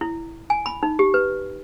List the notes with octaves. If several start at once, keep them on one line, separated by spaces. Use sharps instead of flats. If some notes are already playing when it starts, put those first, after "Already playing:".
E4
G#5
B5
D#4
G4
B4